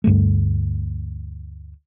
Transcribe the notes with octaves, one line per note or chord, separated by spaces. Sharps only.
D2 G2 G#3 A3